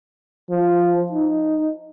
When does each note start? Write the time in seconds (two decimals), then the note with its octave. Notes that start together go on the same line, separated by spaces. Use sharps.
0.50 F3
1.12 D#4